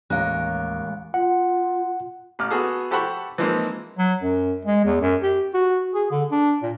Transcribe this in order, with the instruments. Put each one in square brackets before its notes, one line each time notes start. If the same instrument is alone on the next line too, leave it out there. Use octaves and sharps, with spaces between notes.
[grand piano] A1 [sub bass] D#2 [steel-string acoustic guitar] G#3 A#4 C#5 [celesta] F5 F#6
[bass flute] F4 [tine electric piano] F#5
[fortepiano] A1 D6 F6
B3 F#4 G#4 A4
G4 A4 C5 F#5 B5 C#6
E3 F3 G#3 A#3 C4 D#4
[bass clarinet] F#3
F#2
G#3
E2
F#2
G4
F#4
G#4
D3
D4
A#2